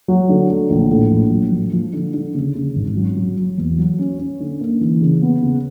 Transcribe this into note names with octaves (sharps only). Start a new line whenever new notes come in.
F#3
D3
A3
A#1
A2
A#1
F#3
F3
F3
D3
D3
C#3
C#3
G#1
F#3
F#3
F#3
E2
F#3
C#4
C#4
D3
A#3
E3
C#3
B3
C#3